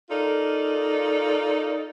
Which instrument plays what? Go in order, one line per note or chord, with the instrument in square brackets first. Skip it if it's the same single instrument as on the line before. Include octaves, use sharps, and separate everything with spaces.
[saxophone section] D#4 F4 A4 A#4 D5